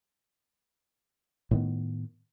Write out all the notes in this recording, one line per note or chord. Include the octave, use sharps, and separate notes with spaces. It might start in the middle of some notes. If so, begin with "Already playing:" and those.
A2 D#3 B3